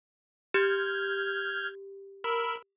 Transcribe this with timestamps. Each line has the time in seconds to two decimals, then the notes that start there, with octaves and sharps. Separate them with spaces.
0.54 G4 F6 G6 G#6
2.24 A#4 B5 E6